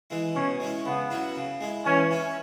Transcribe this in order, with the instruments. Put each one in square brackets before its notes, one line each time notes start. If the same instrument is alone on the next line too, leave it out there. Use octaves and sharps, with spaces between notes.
[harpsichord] E3 G#3 E4
[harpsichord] B2 [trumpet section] C#4
[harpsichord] G#3 C#4 E4
[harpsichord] C#3 [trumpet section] B3
[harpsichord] F#3 C#4 E4
C#3
G#3 E4
[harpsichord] E3 [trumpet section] C#4
[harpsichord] C#4 E4